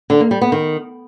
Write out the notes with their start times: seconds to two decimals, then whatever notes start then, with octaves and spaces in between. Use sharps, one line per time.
0.10 D3
0.20 A#3
0.31 G3
0.41 B3
0.52 D#3